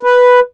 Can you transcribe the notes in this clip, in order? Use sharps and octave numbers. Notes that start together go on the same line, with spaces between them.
B4